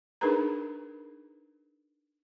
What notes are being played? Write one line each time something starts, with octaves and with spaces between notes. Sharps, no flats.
D4 D#4 G#4 A#4 B4 A#5